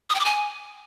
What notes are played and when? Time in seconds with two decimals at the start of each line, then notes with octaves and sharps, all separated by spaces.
0.10 D#6
0.15 G5
0.20 D6
0.25 G#5